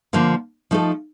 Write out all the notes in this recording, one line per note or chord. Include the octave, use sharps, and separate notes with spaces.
D3 F3 A#3
F3 A3 D#4 A4